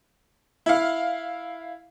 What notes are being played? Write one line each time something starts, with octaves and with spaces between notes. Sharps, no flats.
E4 F5